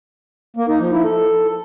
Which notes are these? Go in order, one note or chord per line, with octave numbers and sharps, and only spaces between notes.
A#3
D#4
F3
E4
A4